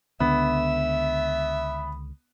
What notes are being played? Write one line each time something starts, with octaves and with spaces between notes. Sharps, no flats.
C#2 D3 B3 E5